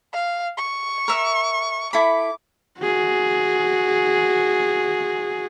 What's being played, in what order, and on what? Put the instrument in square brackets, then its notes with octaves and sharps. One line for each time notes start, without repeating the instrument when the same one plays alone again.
[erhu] F5
C#6
[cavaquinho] A#4 E5
[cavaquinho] E4 A4 B5 [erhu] D6
[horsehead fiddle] F#4 G#4